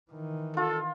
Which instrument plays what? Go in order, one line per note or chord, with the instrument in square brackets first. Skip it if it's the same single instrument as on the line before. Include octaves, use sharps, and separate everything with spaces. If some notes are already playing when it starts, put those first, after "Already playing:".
[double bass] D#3 E3
[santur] F4 [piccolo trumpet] A4